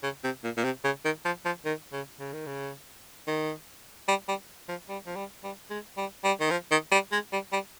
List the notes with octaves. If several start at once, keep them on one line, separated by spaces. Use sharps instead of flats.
C#3
C3
A#2
A#2
C3
C#3
D#3
F3
F3
D#3
C#3
C#3
D#3
C#3
D#3
G3
G3
F3
G3
F3
G3
G3
G#3
G3
G3
D#3
F3
D#3
G3
G#3
G3
G3